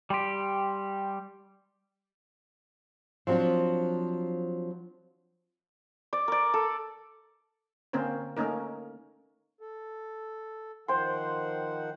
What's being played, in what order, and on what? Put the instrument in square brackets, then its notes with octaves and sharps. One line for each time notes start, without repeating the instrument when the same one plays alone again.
[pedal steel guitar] G3 G4 [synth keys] G5 C6
[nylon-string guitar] F3 F#3 C4 D4
[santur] D5
A#4 D5
A4
[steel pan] D3 A#3 C4 C#4 A#4 C5
A3 A#3 C#4 D#4 A#4
[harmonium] A4
[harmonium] D#3 F3 F#5 [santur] C5 G5 C6